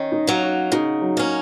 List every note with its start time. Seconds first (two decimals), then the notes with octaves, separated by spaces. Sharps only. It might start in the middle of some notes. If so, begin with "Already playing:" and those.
Already playing: D#3 C#4
0.12 D#4
0.27 F#3 A#3
0.43 F#4
0.72 C#3 D#4
1.02 F#3
1.17 A#3 C#4